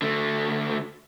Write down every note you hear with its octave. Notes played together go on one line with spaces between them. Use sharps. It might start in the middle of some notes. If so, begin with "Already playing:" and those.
D3 A3